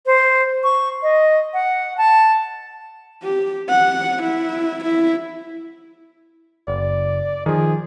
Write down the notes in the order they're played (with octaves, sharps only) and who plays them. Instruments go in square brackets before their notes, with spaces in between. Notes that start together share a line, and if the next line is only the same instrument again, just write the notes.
[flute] C5
C#6
D#5
F#5
A5
[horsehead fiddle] G4
F#5
E4
E4
[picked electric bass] F#1 [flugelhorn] D5
[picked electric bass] D#3 F3 [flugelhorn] G#4